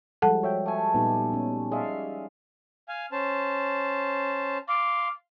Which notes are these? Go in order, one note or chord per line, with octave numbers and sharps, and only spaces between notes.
F3 G3 G#3 A4 F#5 A5
F#4 C#5 E5 G5
A3 G#5
A#2 G3 B3 D#4 G4
C#4
G#3 D5 E5 F5
F5 G#5
C#4 C5 A5
F5 C6 D6